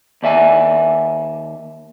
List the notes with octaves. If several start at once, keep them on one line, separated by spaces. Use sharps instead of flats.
D#2 D5 E5 G#5